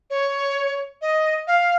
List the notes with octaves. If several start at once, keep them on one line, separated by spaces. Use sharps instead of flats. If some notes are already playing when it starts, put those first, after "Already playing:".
C#5
D#5
F5